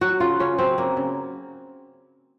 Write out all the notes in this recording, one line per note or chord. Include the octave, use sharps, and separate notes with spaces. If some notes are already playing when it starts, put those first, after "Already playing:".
F#3 F#4
C#3 F4
C#3 C#4
F#3 C4
F#3 A#3
C#3